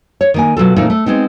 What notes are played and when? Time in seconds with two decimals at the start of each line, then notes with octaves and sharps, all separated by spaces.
0.21 C#5
0.34 D#3 A#3 G#5
0.57 B2 F#3 F4 A4
0.76 A#2 E3 A3 C4 D#4 F4
0.90 A3
1.06 G#3 B3 C4 D#4